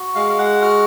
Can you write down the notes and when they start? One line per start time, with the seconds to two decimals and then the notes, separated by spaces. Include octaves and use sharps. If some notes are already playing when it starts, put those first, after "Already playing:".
Already playing: F#4
0.15 G#3 F5
0.30 F5
0.39 F#5
0.62 F#4 F6